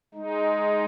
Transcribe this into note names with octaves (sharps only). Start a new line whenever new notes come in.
G#3 D#4